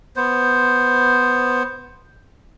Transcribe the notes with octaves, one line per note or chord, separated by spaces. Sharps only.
B3 C5